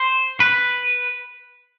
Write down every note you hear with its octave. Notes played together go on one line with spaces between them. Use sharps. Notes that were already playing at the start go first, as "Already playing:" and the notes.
Already playing: C5
B4